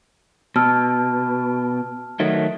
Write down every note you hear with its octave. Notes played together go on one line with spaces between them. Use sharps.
B2 A5 E6 F6
D#3 F#3 A3